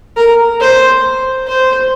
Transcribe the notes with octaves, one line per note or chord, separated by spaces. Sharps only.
A#4
C5
C5